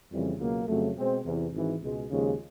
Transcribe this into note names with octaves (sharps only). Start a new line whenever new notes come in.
F2 C#3 E3 G3
C#2 B2 F#3 A#3
F2 C#3 F#3 A3
B2 G#3 C4
E2 C3 E3
G#1 G#2 E3
C#2 B2 G#3
D#2 C#3 F3 G#3 C#4